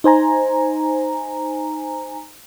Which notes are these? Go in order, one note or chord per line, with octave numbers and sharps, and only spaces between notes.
D#4 C5 G#5 A#5